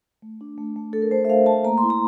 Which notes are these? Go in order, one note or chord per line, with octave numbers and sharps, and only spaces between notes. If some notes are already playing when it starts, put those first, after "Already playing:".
A3
D4
A3
A3
A3 A4
A#4
A3 C5
E5
A3 F5
A3 A5
A#3 A#5
C6
E4
A#5